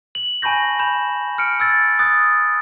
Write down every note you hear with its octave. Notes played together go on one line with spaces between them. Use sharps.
F#7
G#5 A5 B5 C#6 G6 A#6
B5 G6 E7
F6 C#7 D7
E6 G#6 A6
D#6 F#6 A6